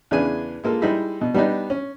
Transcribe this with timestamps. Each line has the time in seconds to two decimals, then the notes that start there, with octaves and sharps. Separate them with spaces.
0.11 E2 C#3 D4 G#4 B4 G#5
0.64 G#3 A#3 F4 A4
0.82 G3 G#3 D#4 E4 G#4
1.21 B2
1.34 G3 B3 D4 D#4
1.70 C#4